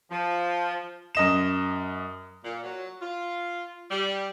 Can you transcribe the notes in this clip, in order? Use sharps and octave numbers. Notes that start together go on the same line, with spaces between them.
F3
F#2 D#5 E7
A#2
F#3
F4
G3